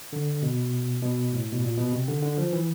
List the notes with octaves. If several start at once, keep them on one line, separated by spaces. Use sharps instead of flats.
D3
B2
B2
A2
B2
A#2
B2
C3
D3
D3
F3
E3